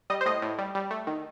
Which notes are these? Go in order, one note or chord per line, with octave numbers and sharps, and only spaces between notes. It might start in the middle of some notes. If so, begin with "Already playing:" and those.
G3 D#5
C5
A2 D#5
A2
G3
G3
A3
D#3